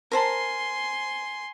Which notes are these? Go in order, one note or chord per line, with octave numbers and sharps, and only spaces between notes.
A#4 C5 G#5 A5 C6